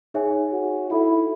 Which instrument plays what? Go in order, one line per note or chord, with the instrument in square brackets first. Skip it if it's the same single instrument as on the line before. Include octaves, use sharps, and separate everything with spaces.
[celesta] D#4 G#4 C#5 E5 G#5
[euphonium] F#4
[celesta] D#4 A4 E5 B5 [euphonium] E4